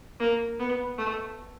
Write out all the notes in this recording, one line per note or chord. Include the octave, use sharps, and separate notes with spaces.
A#3
B3
A3